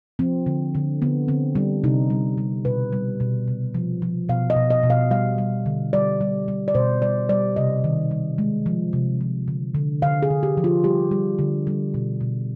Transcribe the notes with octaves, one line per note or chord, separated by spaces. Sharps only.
F3 C4
D3
D3
D3 B3
D3 C4
G3 D4
C3 D#4
G3
G3
B2 B4
G3
B2
C3
F3
F3
B2 F5
D#5
B2
D#5
B2
F5
G3 F5
G3
D3
G3 D5
G3
G3
D5
B2 C5
G3 D5
G3 D5
C3 D#5
D#3
G3
G#3
F3
C3
F3
D3
D3
D3 F5
G#4
D3
G4
F3
F4
G3 G4
G3
D3
G3
B2
B2